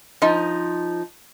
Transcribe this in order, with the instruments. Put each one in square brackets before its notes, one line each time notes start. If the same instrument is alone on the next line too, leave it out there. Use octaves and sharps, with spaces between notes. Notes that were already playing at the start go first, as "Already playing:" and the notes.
[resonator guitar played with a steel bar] F3 D#4